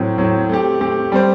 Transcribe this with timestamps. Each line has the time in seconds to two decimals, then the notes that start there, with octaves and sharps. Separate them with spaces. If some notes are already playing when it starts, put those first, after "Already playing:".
Already playing: A2 F#3 C4
0.18 A2 F#3 C4
0.49 A3 C4 G4
0.81 A3 C4 G4
1.12 G3 C4 G4 C5